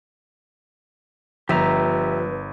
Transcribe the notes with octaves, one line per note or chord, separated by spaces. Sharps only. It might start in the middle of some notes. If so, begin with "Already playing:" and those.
G1 F3 G4 B4 E5 A#5